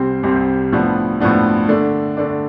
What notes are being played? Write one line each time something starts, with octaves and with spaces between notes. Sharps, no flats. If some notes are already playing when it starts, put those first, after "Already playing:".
Already playing: C2 C3 G3 C4 G4
C2 C3 G3 C4 G4
A2 F3 B3 D4
A2 F3 B3 D4
D3 A3 D4
D3 A3 D4